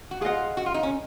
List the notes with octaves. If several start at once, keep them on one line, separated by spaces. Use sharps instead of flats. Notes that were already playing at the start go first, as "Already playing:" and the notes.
F#4
F4 G#4 D#5 F#5
F#4
F4
D#4
C#4